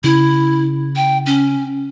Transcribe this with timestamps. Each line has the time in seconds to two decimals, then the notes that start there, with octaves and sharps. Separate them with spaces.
0.04 C#3 E4
0.96 G5
1.26 C#4